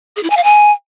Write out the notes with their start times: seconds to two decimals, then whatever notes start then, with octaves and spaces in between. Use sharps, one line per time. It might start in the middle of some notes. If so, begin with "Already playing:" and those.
0.16 G#4
0.23 E4
0.30 G#5
0.37 F5
0.44 G#5